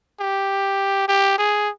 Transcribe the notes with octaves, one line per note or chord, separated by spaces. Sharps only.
G4
G4
G#4